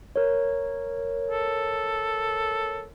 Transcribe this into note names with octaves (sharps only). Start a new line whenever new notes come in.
A#4 C#5
A4